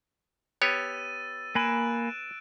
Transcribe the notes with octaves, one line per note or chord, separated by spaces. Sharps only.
B3 G4 C#5 E6 A6 D#7
A#3 G#5 B5 F#6 D7 E7